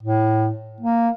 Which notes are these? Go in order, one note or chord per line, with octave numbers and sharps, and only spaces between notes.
A2
A#3